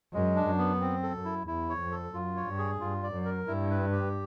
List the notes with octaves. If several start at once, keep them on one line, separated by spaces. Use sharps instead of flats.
F#2 G#3
D4
F#2
B3
C4
A4
F#2
E4
E2 E4
C#5
F2
A4
F#2 F4
C#5
G2
G#4
G2 F4
D5
F#2
A#4
G2 E4
B4
G4